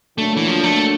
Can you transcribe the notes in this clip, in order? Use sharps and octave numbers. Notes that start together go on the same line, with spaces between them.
D3 F#3 A3 A#3 D4
E3
F3
A3